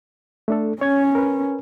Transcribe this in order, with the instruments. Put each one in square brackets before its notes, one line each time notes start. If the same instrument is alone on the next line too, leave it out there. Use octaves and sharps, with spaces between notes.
[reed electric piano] A3 D4 A4
[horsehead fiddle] C#4 [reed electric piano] C#5 G#6
[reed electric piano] A#4 B4